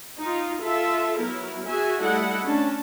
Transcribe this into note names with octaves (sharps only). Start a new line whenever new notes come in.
D#4 F4
F4 A4 E5
F#3 B3 E4 A#4
F#4 G#4 E5 G#5
G3 A3 E4 A4 D#5 F#5
A3 C#4 D4 A5